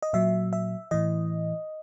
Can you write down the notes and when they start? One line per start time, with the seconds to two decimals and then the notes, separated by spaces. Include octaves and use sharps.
0.02 D#5
0.13 A#2 F#3 E5
0.53 E5
0.91 A2 E3 D#5